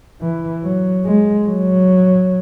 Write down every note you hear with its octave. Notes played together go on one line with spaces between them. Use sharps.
E3
F#3
G#3
F#3